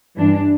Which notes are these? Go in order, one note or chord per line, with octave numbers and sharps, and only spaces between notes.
G2 E3 D4